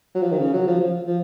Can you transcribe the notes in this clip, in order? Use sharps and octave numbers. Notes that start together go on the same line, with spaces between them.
F#3
F3
D#3
C#3
F#3
F3
F3
F3